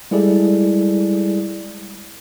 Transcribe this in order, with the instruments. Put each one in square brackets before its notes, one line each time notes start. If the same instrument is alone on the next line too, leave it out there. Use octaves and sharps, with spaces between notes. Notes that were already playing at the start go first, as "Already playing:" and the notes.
[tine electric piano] G3 G#3 E4 G#4 A4 D5